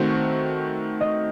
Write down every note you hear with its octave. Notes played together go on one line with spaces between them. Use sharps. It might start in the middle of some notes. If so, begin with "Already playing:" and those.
Already playing: D#3 A3 C4 F#4 C5
D#5